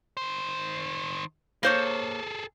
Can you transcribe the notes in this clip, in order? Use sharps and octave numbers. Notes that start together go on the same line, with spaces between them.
D#3 C5
A#3 G#4 A4 C5 C#5